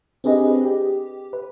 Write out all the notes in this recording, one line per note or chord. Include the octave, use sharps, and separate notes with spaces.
C4 D4 G4 G#4 B4 D#5
G4
B4